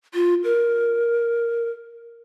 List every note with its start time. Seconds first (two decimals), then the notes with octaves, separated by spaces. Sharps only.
0.14 F4
0.44 A#4